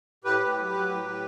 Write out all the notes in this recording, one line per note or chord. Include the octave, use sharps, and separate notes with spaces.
A2 G4 B4
A2
F#3
F#3
A2
A2